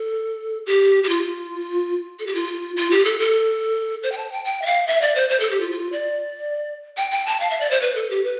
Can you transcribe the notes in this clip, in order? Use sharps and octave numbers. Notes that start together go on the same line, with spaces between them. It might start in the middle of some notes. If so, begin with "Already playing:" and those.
Already playing: A4
G4
G4
F4
A4
G4
F4
F4
G4
A4
A4
C5
G5
A5
G5
G5
E5
F5
E5
D5
C5
C5
A4
G4
F4
F4
D5
G5
G5
A5
F5
E5
D5
C5
B4
A4
G4
B4